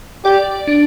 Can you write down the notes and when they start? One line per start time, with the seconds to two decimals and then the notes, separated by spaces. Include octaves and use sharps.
0.25 G4 D5
0.67 D4